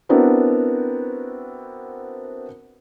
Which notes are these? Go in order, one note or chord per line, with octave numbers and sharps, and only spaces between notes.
B3 C4 D4 E4 F#4 A#4